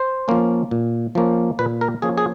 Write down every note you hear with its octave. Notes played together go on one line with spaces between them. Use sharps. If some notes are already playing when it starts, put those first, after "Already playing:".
Already playing: C5
F3 A#3 C#4
A#2
F3 A#3 C#4
A#2 B4
A#4
F3 A#3 C#4 G#4
G#4